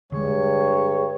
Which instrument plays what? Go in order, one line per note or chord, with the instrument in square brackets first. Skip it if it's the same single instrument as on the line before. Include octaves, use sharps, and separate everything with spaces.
[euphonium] G2 [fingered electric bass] D3 G#3 [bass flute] G#4 [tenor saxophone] C#5